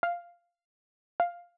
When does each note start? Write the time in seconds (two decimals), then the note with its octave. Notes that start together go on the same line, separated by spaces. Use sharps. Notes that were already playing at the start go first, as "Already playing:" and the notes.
0.03 F5
1.20 F5